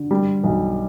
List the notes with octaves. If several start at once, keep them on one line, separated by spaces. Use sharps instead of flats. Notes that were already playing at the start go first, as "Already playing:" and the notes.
Already playing: D3
G3
B1